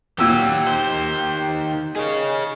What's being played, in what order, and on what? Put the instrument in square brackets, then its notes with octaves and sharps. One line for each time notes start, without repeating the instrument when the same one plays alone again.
[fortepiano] A#2 E6 [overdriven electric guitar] D#3 G4 [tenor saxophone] F#3
[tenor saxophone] C5
[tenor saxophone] D#3 [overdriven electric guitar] G#4 C#5